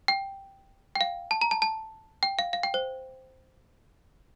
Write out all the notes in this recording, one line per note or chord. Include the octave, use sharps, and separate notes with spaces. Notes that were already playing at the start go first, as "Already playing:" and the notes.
G5
G5
F5
A5
A#5
A5
A5
G5
F5
F5
G5
C5